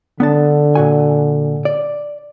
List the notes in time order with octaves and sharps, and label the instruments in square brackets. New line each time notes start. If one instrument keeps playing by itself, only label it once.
[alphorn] D3 [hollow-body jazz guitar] B3 D4 A5
[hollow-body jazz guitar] A#2 F#4 G#5
D5